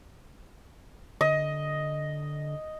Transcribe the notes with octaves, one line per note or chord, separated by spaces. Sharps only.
D3 D#5